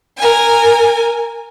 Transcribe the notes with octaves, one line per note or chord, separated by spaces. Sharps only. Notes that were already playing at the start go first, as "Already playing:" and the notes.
A#4 G#5